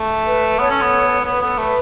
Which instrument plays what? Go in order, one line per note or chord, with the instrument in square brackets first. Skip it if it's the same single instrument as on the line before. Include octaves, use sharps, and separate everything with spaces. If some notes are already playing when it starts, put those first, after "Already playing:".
Already playing: [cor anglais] A3
[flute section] B4
[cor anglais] B3 [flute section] A4 C#5
[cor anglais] C#4
B3
[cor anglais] B3 [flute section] B4
[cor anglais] B3 [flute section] A4
[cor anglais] A3 [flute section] B4